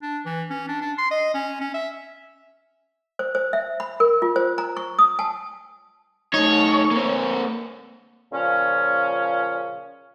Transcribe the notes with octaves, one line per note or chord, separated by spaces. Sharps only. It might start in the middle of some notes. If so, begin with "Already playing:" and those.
D4
E3
C#4
D4
D4
C6
D#5
C#4
C#4
E5
C5
C5
E5
B5
A#4
F4
C5
A#5
C#6
D#6
A5
A3 D#4 C#5
A#3 C4
A#2 C#3 F3 C#4